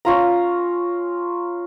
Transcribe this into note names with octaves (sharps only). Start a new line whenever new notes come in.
C#4 F4 A#5